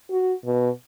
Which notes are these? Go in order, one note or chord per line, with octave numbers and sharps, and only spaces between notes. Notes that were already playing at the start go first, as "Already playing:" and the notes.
F#4
B2